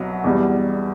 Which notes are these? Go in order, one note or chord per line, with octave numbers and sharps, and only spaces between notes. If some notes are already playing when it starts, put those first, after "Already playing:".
Already playing: C2 B2 F#3
E2 B2 G3